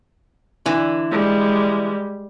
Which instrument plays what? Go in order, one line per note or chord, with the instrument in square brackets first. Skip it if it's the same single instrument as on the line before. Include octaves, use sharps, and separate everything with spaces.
[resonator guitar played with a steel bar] D3 E3
[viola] G3 G#3